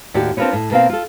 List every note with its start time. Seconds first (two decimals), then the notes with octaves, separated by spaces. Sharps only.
0.14 D#2 A2 F#4 G4 D5
0.37 C4 D4 F4 A#4 B4 C#5
0.53 A2
0.71 B2 A#3 C4 F5
0.89 F4 A4